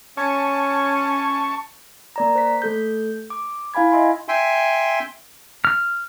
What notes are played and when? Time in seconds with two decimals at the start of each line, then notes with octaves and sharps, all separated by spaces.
0.17 C#4 A5 C#6
2.16 A#3 D5 A#5
2.35 C5 B6
2.62 A3 A4 G6
3.30 D6
3.74 E4 F5 G#5 B5 G#6
3.92 D#5 E5 G#5 C6
4.28 E5 G5 G#5 C6
5.65 F6